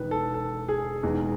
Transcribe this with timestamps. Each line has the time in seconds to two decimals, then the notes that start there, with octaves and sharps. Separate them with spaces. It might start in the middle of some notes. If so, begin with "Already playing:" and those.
Already playing: E1 E2 D#3 B4
0.11 A4
0.34 A4
0.68 G#4
1.03 E1 E2 D#3 G#3